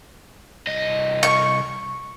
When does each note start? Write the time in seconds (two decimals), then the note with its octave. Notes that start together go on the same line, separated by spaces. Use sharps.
0.67 C2 D#5
1.23 C#6